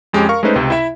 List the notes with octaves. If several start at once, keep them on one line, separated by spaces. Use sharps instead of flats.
F2 G#3 C#4 G4
A#4 F5 C#6
G#3 A3 C#4 D#4 B4 C5
C#2 C3
E4 E5